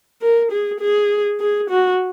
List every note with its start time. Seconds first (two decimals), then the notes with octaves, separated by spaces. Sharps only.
0.22 A#4
0.51 G#4
0.80 G#4
1.40 G#4
1.70 F#4